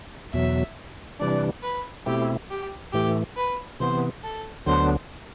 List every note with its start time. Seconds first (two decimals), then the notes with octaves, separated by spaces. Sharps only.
0.33 E2 B2 F#3 E5
1.19 C3 E3 G3 D4 D5
1.63 B4
2.06 B2 A3 C4 E4 G4
2.50 G4
2.93 A2 E3 A3 G4
3.37 B4
3.80 C3 E3 B3 C5
4.23 A4
4.66 D2 D3 F#3 B3 D4 C5